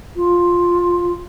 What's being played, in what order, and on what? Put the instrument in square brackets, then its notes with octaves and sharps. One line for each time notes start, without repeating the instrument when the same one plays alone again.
[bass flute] F4